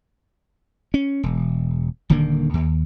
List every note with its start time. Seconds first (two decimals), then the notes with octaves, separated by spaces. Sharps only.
0.94 C#4
1.23 E1
2.10 D#1 D3 D#3 A#3
2.54 D#2